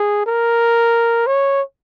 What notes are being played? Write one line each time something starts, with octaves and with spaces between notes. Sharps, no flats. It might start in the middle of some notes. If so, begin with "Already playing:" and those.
Already playing: G#4
A#4
C#5